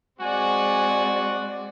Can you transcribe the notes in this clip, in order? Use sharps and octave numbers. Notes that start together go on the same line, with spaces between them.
G#3 C4 F#4 D5 G#5